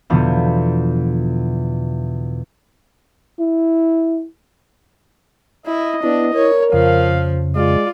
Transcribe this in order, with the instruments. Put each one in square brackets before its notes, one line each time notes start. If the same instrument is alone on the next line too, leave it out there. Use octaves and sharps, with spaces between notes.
[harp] E2 B2 D3 F3 F#3 B3
[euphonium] E4
[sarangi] E4 [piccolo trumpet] D#5
[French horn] B3 [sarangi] D4 [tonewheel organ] E4
[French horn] A#4 [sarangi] C#5
[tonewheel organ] F2 C#3 [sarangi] F3 [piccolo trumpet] F5
[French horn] G#3 [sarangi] F4 [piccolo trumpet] D5